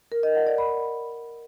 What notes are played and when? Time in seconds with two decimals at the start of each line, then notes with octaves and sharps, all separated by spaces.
0.12 A#4
0.23 D#5
0.35 F#5
0.47 D5
0.58 B5